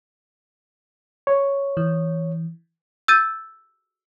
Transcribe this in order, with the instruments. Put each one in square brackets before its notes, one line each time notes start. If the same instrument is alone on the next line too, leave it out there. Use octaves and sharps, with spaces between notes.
[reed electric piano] C#5
[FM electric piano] E3
[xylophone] E6 G6 A6 D#7